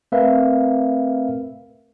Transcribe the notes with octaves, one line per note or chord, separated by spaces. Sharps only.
A3 C4 A#4 B4 E5 F5